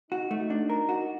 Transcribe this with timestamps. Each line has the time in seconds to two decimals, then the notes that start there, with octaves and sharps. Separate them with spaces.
0.12 D#4 F#4
0.31 A3
0.50 D4
0.69 A#4
0.89 F#4